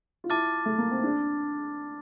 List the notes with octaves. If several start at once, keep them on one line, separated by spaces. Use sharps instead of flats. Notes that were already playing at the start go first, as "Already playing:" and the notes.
F4
E4 A5 D6 F6 A6
A3
A#3
C4
D4